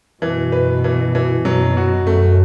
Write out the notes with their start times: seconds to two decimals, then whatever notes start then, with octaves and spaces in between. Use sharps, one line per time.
0.22 F#2 B2 E3
0.52 B4
0.84 E3
1.15 E3
1.45 F#2 B2 F#3
1.77 F#4
2.07 F#2 A3